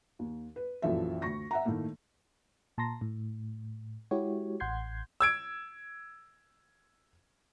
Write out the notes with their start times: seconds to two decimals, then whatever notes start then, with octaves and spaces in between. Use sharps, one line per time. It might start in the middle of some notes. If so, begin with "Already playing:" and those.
0.19 D#2
0.56 B4
0.82 A#1 F#2 E3 F3 A4 E5
1.22 D2 C#6 A#6
1.51 E5 F#5 A#5
1.65 A2 D#3 A3 A#3
2.78 A#2 A5 A#5 C6 A#6
3.01 A2
4.11 G#3 E4 F#4 G4 C#5
4.60 A1 F#5 C6 G6 G#6 C7
5.20 E6 G#6 D7